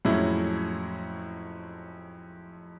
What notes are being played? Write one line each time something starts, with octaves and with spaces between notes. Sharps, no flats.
F2 A2 F#3 G#3 C#4 E4